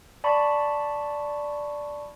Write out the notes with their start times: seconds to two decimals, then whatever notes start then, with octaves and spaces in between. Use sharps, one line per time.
0.24 D5 A5 B5 C#6